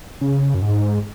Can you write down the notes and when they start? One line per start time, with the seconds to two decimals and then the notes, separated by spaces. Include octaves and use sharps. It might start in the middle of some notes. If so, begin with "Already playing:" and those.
0.21 C#3
0.54 F#2
0.62 G#2